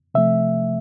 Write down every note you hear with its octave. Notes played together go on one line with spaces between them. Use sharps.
C3 F3 A3 E5